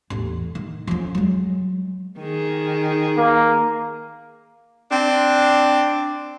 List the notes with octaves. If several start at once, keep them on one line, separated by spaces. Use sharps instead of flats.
A1 E2
D#3
F2 C#4
F#3 G#3
D#3 G#4
A#3
C4 D4